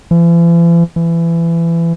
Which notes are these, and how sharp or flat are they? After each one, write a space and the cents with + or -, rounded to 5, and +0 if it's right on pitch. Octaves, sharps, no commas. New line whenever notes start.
E3 +45
E3 +25